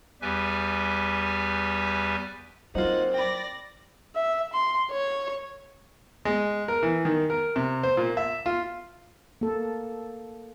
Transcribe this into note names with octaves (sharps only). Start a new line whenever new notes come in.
E2 G3 G4 B4 E5 G#5
F#3 A#3 C4 D#4 F4 F#5
D5 G5 B5 A#6
E5
C6
C#5
G#3
A#4
E3
D#3
A#4
C3
C5
A#2
E5
F4
A#3 A4